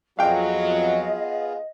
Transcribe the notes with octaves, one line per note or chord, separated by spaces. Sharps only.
F2 F#3 B3 F4 G#4 D#5 F5 G5